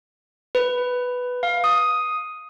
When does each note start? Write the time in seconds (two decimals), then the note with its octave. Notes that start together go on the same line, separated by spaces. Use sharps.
0.55 B4
1.43 F5
1.64 D#6